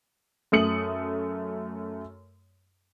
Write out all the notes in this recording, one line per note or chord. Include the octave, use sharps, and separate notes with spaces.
F#2 A3 D#6 C#7 F#7